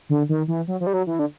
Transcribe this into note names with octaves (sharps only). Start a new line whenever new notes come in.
D3
D#3
E3
F#3
F3
G3
F#3
E3
D3